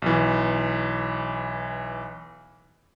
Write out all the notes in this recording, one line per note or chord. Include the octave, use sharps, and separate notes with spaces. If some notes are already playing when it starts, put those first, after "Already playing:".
B1 E3